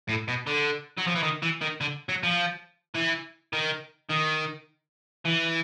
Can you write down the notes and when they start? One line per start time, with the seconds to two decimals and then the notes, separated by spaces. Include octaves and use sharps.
0.09 A2
0.28 B2
0.47 D3
0.97 F#3
1.07 F3
1.15 E3
1.23 D#3
1.43 E3
1.62 D#3
1.81 D3
2.09 F#3
2.23 F3
2.96 E3
3.53 D#3
4.10 D#3
5.25 E3